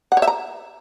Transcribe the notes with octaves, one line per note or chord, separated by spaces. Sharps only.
F#5
C#5
E5
A#5